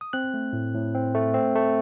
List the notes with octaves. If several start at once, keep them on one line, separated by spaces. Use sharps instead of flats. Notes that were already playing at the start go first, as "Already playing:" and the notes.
D#6
C4 F#6
A3
A2
A2
C4
A3
C4
A3